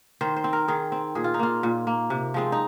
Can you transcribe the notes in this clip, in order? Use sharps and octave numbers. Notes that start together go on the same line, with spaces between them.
D#3 C5
C5
C4
A#4
D#3 G#4
C4
A#2 G#4
F4
D#4
A#3 F4
A#2
A#3
C3
F3 G#3 C4
D#4